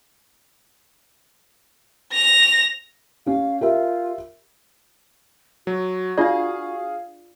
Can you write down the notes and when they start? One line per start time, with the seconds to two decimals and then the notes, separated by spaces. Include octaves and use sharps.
2.13 A#6 F7
3.26 C#4 G4 F5
3.61 F4 G4 A#4 E5
5.67 F#3 F#4
6.18 D4 F4 G#4 D5 F5